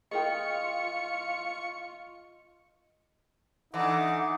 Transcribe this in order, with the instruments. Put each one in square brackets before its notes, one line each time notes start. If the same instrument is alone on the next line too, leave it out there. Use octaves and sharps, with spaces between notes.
[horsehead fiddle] F4 [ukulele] G#4 A#4 G5 [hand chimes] D#5 [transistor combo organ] C#6
[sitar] D3 E3 [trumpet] D#4 [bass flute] F#5